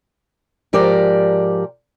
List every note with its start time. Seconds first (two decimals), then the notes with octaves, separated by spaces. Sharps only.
0.73 G#2 F3 G4 A#4 D5 A#5